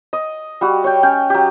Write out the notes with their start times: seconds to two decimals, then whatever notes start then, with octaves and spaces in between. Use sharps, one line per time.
0.13 D#5
0.61 G3 F#4
0.84 C#5 G5
1.03 C#4 G5
1.30 F#3 G4